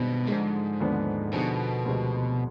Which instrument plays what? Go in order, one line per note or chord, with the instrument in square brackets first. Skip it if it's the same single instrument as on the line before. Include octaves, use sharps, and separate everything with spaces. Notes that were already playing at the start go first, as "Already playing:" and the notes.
Already playing: [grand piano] G1 G2 D#3 G#3 C4 [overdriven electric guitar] B2
[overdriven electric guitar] G#2 [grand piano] D3 F3 G#3
[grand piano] D#2 D3 F3 B3 D4
[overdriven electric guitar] B2 [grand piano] D3 F3 B3 D#4 G#4
[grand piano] D2 C3 F3 G#3